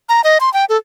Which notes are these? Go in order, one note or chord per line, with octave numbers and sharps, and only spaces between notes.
A#5
D#5
C6
G5
A4